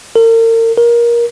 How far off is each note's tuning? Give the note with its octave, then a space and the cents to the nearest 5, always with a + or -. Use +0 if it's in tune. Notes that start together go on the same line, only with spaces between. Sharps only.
A#4 -40
A#4 +20